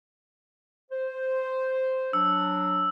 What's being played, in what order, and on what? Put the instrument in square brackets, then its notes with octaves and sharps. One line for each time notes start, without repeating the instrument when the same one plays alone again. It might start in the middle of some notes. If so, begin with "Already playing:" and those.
[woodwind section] C5
[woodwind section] F#3 D4 [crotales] E6